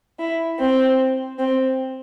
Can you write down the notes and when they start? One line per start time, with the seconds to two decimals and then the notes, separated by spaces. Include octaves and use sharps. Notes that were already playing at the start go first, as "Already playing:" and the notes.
0.20 E4
0.59 C4
1.38 C4